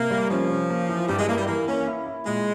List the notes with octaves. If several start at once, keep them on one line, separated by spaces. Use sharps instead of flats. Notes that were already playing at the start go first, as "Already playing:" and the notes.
Already playing: C3 A#3
G3
F3 C#4
C#4
A#3
E3
G2 G3
G#3
A#3 E4
G3
E3 A#3
A#3 C#4
E4
E4
A#2 G#3